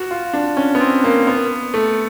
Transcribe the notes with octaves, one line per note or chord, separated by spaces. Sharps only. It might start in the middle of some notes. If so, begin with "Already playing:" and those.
Already playing: F#4
F4
D4
C#4
B3
C4
A#3
B3
A3